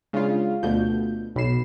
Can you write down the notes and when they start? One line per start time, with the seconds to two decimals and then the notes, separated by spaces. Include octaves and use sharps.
0.13 C#3 G#3 D4 F4 F5
0.63 D2 B2 A3 F4 G6
1.36 B1 B2 B5 C7 E7